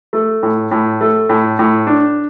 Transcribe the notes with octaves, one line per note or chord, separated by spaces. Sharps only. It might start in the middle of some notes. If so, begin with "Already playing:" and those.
A3
A2
A2
A3
A2
A2
D4